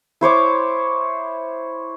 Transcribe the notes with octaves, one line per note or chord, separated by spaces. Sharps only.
E4 C5 C#5 D6